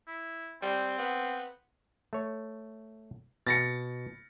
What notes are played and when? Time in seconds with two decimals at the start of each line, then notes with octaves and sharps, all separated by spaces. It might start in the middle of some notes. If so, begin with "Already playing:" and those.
0.07 E4
0.62 G3 C4
0.98 B3
2.13 A3 C#5
3.47 B2 A6 A#6 C#7